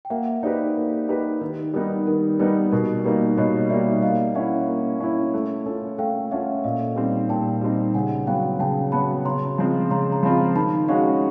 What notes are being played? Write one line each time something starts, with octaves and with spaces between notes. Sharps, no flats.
G5
A#3 E5 F#5
D#4 G4 B4 C5 D5
A#3
D#4 G4 B4
D#3 B4
G3 B3 D#4 A#4
D#3 A#4
G3 B3 D#4 B4
B2 A#4
G3 A#3 D#4 B4
B2 C#5 D#5
G3 A#3 D#4 D5 E5
A#3 D#5 F5
C#4 E4 E5 F#5
A#3
C#4 E4
A3
C#4 F4 A4
A3 F5 G5
C#4 F4 A4 E5 F#5
A#2 D#5 F5
G3 C4 D#4
A#2 G5 A5
G3 C4 D#4
C#3 F#5 G#5
F#3 B3 F5 G5
C#3 G5 A5
F#3 B3 A5 B5
C#3 A#5 C6
F3 G#3 C4 F4
C#3 A#5 C6
A#5
F3 G#3 C4 F4 A5 B5
D#3 A5 B5
G#3 C#4 F#4 D#5 F5